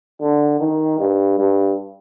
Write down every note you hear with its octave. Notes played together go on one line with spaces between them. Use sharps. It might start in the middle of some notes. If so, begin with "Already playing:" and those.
D3
D#3
G2
G2